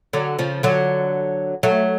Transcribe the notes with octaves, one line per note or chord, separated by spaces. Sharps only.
D3 F#3
C#3 F3
D3 F#3
F#3 A3